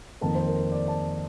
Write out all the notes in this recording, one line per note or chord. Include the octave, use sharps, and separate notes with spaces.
F2 D#3 A#3 A5
C5
A#4
A#4
D5
A5